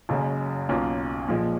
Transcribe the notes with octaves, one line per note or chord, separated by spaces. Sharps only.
F#1 F#2 C#3 G#3
B1 B2 A#3 C#4 F4
A#2 F3 G#3